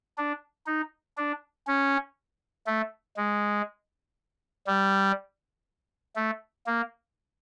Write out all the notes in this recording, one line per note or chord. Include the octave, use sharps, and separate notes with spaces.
D4
D#4
D4
C#4
A3
G#3
G3
A3
A#3